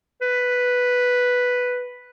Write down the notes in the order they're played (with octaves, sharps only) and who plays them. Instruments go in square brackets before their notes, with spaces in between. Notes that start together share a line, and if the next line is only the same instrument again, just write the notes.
[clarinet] B4